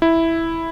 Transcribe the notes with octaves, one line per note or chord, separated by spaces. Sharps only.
E4